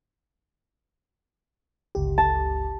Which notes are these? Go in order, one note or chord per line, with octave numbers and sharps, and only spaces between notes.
G1 C#2 G4
A5